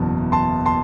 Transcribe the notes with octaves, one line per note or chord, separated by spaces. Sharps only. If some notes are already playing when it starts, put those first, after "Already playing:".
Already playing: F#1 E2 B2 A5
A5 C6
A5 C6